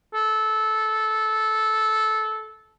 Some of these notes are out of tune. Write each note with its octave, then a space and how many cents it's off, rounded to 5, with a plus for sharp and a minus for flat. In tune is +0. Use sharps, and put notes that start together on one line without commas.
A4 -15